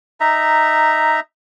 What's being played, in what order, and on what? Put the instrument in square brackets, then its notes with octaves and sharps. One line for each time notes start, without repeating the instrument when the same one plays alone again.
[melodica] D#4 E5 A#5